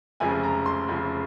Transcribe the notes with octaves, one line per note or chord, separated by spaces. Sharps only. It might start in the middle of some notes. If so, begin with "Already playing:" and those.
F1 F2 C#3 F3 G#3 G#5
A#5
C6
F1 F2 C#3 F3 G#3